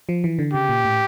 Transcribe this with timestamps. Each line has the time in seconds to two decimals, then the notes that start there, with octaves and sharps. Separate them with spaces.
0.09 F3
0.24 E3
0.39 D3
0.53 C#3 G4
0.69 A#2
0.85 A2